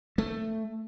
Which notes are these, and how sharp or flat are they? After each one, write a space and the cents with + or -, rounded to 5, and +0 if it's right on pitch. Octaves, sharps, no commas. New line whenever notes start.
A3 +10